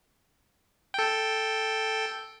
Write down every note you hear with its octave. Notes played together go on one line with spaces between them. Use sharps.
A4 G5